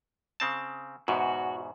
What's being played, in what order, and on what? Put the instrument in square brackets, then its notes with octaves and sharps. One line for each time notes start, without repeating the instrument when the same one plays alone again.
[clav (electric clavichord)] C#3 C4 A5
[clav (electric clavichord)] E2 G#2 B2 [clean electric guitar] F#4